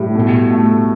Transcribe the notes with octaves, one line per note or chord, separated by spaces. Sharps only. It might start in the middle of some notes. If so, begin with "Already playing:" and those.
Already playing: A2 G3
B2
A3